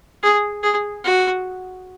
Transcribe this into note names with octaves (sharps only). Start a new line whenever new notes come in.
G#4
G#4
F#4